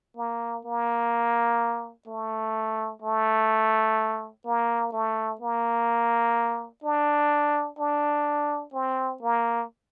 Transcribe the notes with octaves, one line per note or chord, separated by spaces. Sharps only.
A#3
A#3
A3
A3
A#3
A3
A#3
D4
D4
C4
A#3